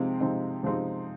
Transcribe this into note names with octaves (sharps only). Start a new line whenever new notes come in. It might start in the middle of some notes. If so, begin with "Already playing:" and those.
Already playing: C3 F3 G#3 C4 D#4
C3 F3 G#3 C4 D#4
C3 F3 G#3 C4 D#4